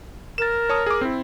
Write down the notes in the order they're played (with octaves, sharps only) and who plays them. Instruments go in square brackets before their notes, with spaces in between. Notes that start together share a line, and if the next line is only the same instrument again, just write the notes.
[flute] A#4 [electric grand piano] A6 E7
[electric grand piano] C#5 A5 D#6
G#4 D6
C4 E4